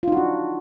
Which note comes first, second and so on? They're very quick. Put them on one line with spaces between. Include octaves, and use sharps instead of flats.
F4 D#4 F#4 D4